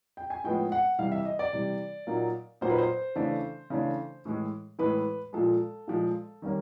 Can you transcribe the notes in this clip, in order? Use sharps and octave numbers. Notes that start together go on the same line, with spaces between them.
G5
G#5
A2 F3 G#3 B3 G5
F#5
C3 E3 G3 F5
E5
D#5
D5
C3 E3 G3
A#2 F#3 A#3 D#4
A#2 F#3 A#3 D#4 C5
B4
C5
C#3 E3 A3 D4
C#3 E3 A3 D4
A2 E3 G#3
A2 E3 G#3 B4
A#2 F3 G#3 A4
A#2 F3 G#3
D#3 G3 A#3 C#4